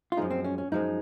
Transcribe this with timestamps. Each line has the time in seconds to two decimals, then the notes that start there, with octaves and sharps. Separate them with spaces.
0.12 F4
0.17 F#2 F3 G#3 D#4
0.30 C4
0.44 C#4
0.58 C#4
0.72 F#2 F3 G#3 D#4